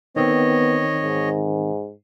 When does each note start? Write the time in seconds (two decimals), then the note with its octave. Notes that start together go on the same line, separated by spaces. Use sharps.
0.16 D#3 B3 C4 C#5 D#5
1.02 G#2